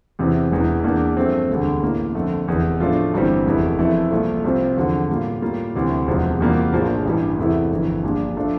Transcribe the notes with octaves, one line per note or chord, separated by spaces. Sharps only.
E2 C3 E3
E1 E2 E3
E2 E3 A#3 D4
G2 F3 A3 C4
E1 D2 D3 G3
A1 A2 E3 A#3
F2 D3 A3
F1 E2 E3
A2 F3 A3 D4 F4
G1 G2 E3 G3 C4
F1 E2 E3 A3
F2 E3 A3 E4
C2 A#2 F3 A3
C2 C3 F3 C4 F4
E2 D3 F3
A2 G3 A#3 F4
A2 G3 A#3 F4
D2 C3 E3 G3
E1 E2 C3 F3
E2 C3 G3 A#3 F4
A#1 A2 F3 A#3
A1 G2 E3 G3
E2 C3 E3 A3 E4
G1 F2 E3
A#1 A#2 G3 D4
F3 A3 D4 F4